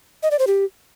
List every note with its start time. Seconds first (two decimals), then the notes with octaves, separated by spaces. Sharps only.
0.23 D#5
0.31 D5
0.39 C5
0.47 G4